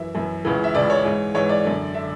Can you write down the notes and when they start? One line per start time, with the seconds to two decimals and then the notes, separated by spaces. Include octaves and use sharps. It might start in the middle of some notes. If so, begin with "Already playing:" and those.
Already playing: F#2 E3 E5
0.15 F#2 E3
0.45 C#2 C#3 E3
0.64 E5
0.75 C#2 C#3 E3 D5
0.90 C#5
1.04 G#2 E3
1.35 G#2 E3 C#5
1.49 D5
1.64 F#2 D3
1.94 D3 E5